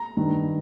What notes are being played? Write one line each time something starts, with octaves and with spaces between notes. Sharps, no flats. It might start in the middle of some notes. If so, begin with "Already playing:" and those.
Already playing: A#5
G2 D#3